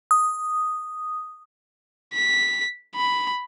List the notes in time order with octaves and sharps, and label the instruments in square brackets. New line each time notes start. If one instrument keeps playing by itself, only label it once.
[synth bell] D#6
[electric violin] B6
B5